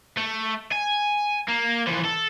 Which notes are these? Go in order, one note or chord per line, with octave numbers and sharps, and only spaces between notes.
A3
G#5
A#3
E3 F3
A4